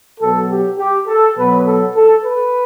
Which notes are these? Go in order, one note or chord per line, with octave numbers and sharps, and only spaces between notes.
B2 F#3 A4
G4
G4
A4
B2 F#3 B4
A4
A4
B4